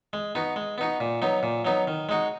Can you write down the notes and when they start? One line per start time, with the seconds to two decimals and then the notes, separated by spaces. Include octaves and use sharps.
0.13 G#3
0.35 B3 D#4 F#4
0.56 G#3
0.78 B3 D#4 F#4
1.00 A#2
1.22 F#3 B3 D#4
1.43 A#2
1.65 F#3 B3 D#4
1.88 D#3
2.09 G#3 D#4 F#4